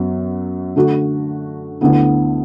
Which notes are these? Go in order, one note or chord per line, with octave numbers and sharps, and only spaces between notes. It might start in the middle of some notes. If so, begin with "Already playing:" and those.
Already playing: F#2 F#3 B3
D3 A3 F#4
D2 D3 B3 E4